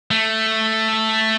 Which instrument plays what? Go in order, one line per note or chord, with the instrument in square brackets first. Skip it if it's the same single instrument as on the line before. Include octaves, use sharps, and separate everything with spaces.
[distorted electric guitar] A3